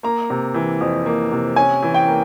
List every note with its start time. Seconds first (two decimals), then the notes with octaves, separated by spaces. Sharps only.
0.03 A#3 A#5
0.30 C3
0.54 E3
0.81 F2
1.06 A#3
1.32 C3
1.56 C#4 G#5
1.82 E3
1.94 G5
2.08 A#3